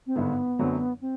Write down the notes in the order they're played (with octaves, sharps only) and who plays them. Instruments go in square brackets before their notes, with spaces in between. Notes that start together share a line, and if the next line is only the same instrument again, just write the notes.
[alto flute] C4
[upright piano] G#1 G2 D3 [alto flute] B3
[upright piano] F#2 D3 F#3 A3 C4
[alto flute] C4